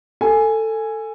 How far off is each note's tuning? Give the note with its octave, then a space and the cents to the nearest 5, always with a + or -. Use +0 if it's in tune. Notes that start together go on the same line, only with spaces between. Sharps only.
A4 +15 G#5 +0